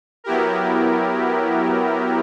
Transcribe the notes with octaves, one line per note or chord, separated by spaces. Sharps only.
F#3 B3 E4 G4 A#4